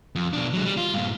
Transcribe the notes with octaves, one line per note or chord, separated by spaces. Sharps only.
F2
B2 D4
F#3 G#3
G3
F4
G2 A#2